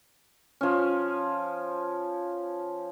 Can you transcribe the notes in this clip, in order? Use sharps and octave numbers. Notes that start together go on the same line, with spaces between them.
F3 C#4